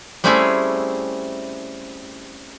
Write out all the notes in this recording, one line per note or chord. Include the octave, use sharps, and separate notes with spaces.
G3 A3 C4 C#4 E4 G#4